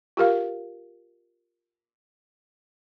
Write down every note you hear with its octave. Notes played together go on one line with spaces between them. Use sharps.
F4 G4 A#4 F5